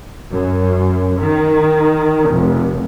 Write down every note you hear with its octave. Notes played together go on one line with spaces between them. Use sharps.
F#2
D#3
F1